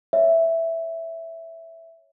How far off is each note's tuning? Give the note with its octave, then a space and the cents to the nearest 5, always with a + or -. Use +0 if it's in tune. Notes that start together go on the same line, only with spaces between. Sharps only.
C#5 +0 E5 +0